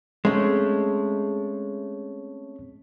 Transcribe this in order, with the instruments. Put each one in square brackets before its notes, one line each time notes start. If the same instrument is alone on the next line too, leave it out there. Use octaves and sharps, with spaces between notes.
[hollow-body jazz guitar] G#3 A3 [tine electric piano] C4 C#4 C#5